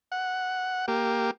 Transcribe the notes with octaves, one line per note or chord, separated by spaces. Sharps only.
F#5
A#3 G4